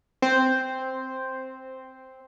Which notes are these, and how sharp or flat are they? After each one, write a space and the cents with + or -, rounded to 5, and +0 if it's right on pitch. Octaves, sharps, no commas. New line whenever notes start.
C4 +0 C5 +0